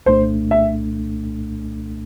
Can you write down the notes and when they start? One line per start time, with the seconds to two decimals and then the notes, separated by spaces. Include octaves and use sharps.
0.06 C2 A#2 A3 D4 C5
0.51 E5